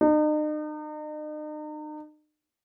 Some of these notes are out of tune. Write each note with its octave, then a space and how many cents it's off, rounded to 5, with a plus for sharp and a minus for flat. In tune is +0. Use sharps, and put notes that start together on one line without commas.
D#4 -40